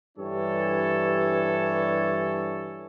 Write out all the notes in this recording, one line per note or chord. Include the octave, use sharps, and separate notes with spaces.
G2 E3 D4 G4 A4 C#5